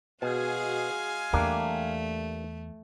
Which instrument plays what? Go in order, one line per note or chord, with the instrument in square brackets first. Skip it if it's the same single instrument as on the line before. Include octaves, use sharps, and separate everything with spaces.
[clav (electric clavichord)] B2 [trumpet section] G#3 F5 G#5 [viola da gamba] F#4 G#4
[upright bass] E2 [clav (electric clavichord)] G3 A#3 D4 [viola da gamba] A3